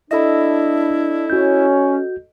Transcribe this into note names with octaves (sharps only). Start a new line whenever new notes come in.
D4 E4 A4 D#5 E5 B5
C#4 F#4 G6